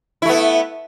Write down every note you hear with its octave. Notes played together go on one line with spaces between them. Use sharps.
A3 B3 E4